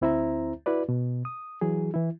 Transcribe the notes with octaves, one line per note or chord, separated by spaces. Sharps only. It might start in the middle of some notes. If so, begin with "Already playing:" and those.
D2 C4 E4 C5 E5 A#5
E4 F#4 B4 D5
B2
D#6
E3 F#3 G#4
E3 E4